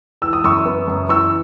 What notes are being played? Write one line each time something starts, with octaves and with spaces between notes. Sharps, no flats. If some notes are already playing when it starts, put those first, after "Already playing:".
E3 E6
D#6
F#2 C#6 E6
B3
F#2
E3 C#6 E6